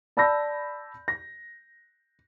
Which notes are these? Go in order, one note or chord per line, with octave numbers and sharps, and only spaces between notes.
D5 A5 B5 E6 G6 A#6
A#6